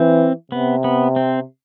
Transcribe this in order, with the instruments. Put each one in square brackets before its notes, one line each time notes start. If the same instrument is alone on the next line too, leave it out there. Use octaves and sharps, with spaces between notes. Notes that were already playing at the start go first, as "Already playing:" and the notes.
Already playing: [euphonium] E3 [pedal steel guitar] C4
[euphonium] C3 [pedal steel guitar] B3
[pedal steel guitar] B3
C4